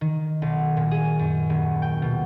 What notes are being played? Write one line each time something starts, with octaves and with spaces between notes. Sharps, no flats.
D#3
B1
A#2
G#4
F#2
D#1
G5
B2